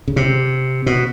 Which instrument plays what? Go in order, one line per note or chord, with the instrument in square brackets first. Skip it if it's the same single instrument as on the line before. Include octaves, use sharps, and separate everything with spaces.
[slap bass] C#3
C3
B2